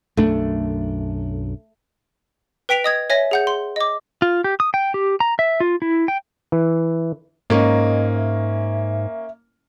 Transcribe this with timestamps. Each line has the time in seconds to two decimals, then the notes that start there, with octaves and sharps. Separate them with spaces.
0.17 B1 F#2 A3 D4
2.69 B4 G5 B6 D7 F7
2.84 D#5 D#6 G#6
3.10 C#5 E5 G#5 A#6
3.31 G#4 F#5 G6
3.47 C6
3.76 D#5 D6
4.22 F4
4.44 G4
4.60 D#6
4.74 G5
4.94 G4
5.20 A#5
5.39 E5
5.60 F4
5.82 E4
6.08 G5
6.52 E3
7.50 G#2 A#3 C#4 D#5
8.15 E5